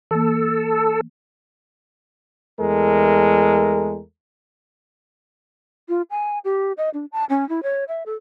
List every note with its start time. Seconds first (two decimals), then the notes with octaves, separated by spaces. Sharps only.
0.11 E3 A#3 A4
2.60 E2 G#3 A3 A4 A#4
5.89 F4
6.10 G#5
6.45 G4
6.77 D#5
6.94 D4
7.12 A5
7.30 C#4
7.49 E4
7.63 C#5
7.88 E5
8.06 A4